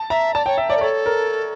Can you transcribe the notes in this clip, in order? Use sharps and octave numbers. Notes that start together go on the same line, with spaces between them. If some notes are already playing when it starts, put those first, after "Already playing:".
Already playing: A5
E5 A#5
D5 A5
C#5 G5
E5
C#5 D5
A#4
A4 C#5
A#4